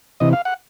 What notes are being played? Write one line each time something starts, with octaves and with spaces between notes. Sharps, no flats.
C3 E3 D#5
F5
F#5